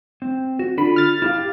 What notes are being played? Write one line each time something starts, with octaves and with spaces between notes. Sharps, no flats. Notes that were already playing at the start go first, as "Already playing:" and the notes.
C4
F#4
D3 F4 B5
F6 A6
E4 G4 F5